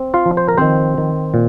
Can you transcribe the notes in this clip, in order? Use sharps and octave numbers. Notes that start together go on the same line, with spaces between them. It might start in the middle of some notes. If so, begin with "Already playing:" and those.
Already playing: C4
F4 F5
F3
C5
A#4
D#3 C4 C5
D#3
A#2